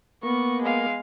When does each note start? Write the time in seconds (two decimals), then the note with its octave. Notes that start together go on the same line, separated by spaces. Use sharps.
0.23 A#3 B3 C#6
0.62 G#3 F5